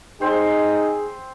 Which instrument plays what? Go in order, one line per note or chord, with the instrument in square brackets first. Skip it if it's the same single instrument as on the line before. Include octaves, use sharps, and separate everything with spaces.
[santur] C4 C5 [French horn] D#4 [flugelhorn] G#4